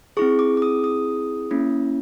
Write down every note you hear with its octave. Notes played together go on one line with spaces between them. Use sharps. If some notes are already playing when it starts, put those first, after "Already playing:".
C4 E4 G#4 C#6
D6
D6
D#6
D#6
A#3 C#4 E4